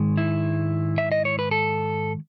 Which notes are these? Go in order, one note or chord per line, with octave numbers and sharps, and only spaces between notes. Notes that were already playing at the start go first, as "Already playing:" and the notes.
Already playing: G#2 D#3 G#3
E4
E5
D#5
C#5
B4
A4